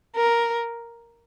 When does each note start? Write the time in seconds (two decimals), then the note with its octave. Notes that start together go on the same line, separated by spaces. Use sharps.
0.16 A#4